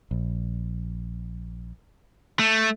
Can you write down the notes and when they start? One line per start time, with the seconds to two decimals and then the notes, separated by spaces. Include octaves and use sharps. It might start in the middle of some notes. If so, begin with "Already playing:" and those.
0.11 A#1
2.39 A3